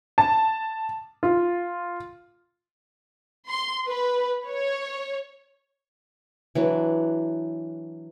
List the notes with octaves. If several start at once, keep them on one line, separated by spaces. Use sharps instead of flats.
A5
F4
C6
B4
C#5
E3 F#3 D4